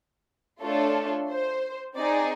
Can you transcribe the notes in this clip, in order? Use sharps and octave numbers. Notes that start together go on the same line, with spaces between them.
A3 D4 F4 A4 C#5
C5
C4 D#4 G#4 D5